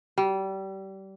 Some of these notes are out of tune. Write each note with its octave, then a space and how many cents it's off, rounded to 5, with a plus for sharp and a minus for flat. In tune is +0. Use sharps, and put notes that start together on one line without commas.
G3 -25